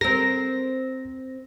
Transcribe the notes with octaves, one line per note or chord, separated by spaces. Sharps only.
C4 A#4 A#6